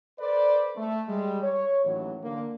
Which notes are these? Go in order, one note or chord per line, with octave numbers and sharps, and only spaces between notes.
A4 B4 C5 D5
A3
G3 G#3
C#5
A1 D#2 E3 F#3
D3 A#3